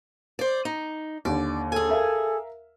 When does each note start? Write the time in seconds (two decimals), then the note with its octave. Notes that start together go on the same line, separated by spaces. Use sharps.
0.39 C5 D5
0.65 D#4
1.25 D#2 D3 D5
1.72 G#4 A4 G#5
1.89 A#4 E5 F5